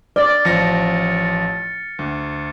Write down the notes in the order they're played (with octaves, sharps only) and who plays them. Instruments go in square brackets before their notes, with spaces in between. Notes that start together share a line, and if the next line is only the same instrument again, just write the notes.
[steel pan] D5 [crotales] F6 A6
[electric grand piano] A1 F3 A#6 [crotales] C#7
[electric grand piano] D2